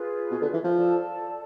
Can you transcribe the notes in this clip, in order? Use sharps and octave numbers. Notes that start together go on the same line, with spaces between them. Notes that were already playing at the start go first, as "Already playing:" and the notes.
Already playing: F4 G#4 B4
B2
D3
E3
F3
A4 D5 A5